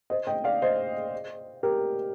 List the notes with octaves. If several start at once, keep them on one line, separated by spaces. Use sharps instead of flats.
C5 D#5
D#5 G5
D5 F5
C5 D#5
G4 A#4